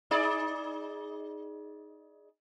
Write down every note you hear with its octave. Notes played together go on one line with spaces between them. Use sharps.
D#4 G#4 D5